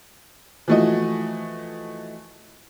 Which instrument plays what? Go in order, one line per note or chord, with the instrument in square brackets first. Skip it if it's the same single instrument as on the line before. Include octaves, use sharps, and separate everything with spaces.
[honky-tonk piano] E3 F3 A3 F#4 D#5